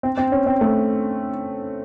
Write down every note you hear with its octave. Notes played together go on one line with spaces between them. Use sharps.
C4
C4
C#4
C4
A3